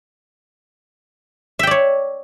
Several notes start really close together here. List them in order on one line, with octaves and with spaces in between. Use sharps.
E5 G5 D5 C#5